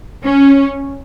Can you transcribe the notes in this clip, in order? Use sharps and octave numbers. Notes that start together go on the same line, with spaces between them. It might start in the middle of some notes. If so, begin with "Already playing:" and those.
C#4